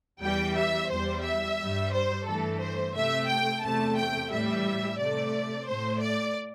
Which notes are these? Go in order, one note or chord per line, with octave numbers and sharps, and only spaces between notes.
E2 E3 G3 G5
E5
E2 E3 G3 C5
E5
G2 G3
C5
G2 E3 A3 A4
C5
C3 A3 E5
G5
E2 C3 A3 A5
G5
A2 E3 G3 E5
C3 A3 D5
A2 A3 C5
D5